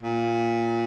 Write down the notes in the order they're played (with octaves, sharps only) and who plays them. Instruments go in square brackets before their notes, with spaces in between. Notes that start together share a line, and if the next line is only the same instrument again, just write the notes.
[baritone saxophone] A#2